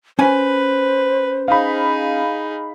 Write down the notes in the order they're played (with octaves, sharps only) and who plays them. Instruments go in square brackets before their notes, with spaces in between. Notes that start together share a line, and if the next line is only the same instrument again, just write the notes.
[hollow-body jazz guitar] C#4 G#5 [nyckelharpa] B4 [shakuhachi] C5
[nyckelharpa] D#4 G#4 [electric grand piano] F5 B5